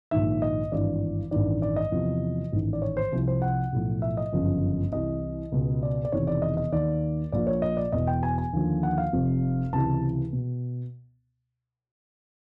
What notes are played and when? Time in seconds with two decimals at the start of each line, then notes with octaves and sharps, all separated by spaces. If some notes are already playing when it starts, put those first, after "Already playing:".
0.11 A#1 G#2 D#3 E5
0.42 D#5
0.72 G#1 G2 E3 D5
1.31 A1 G2 D#3 D5
1.62 D5
1.76 D#5
1.92 E2 C3 F3
2.53 A1 G#2 D#3
2.73 D5
2.82 C#5
2.97 C5
3.12 C2 C3 F3
3.27 C5
3.42 F#5
3.73 B1 A2 F3
4.02 E5
4.17 D#5
4.32 G1 F#2 C#3 F3
4.92 C2 C3 E3 D#5
5.52 C#2 B2
5.83 D5
6.05 D5
6.12 E1 E2 C3 D#3 C#5
6.27 D5
6.42 D#5
6.57 D#5
6.72 D#2 D#3 D5
7.32 A#1 A#2 F3 D5
7.47 C#5
7.62 D#5
7.77 D5
7.92 E1 E2 B2 D#5
8.07 G5
8.23 G#5
8.38 G#5
8.53 D#2 D3 F3
8.83 F#5
8.98 F5
9.13 F1 F2 C3 F3
9.73 C#2 C3 E3 A5
10.33 B2